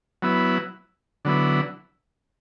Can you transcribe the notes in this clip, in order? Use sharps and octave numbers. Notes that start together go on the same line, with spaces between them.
F#3 B3 E4
D3 F#3 B3 E4